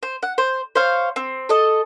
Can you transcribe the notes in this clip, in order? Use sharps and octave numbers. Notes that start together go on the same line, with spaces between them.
C5
F#5
C5
C5 C#5 F5
C4
A4 D#5